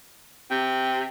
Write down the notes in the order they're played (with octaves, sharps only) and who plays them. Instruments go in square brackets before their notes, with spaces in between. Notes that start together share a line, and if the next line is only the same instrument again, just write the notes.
[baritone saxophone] C3 [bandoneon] G5